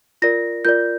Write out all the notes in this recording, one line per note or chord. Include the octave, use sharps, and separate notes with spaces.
F4 A#4 D5 A#6
F4 A#4 D5 G6